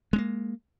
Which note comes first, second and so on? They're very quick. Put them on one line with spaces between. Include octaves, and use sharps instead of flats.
G#3 C4 A#3